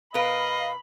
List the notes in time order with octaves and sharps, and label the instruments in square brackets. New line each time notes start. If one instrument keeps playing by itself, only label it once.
[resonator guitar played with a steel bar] B2 A#4 B4 [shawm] D#5 [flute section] F5 [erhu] B5